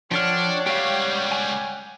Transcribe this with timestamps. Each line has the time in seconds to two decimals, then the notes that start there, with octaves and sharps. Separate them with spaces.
0.11 F3 D4 A4 C#5 D5 F#5 G5 F6
0.66 C#2 G3 G4 F5
1.32 G#5